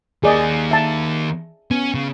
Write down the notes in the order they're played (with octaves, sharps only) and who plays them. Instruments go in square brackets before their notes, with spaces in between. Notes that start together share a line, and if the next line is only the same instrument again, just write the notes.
[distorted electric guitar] D#3 A#3 [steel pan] G#4 D5 D#5
[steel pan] E5 A5
[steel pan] B3 [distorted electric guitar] C#4
[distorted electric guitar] C#3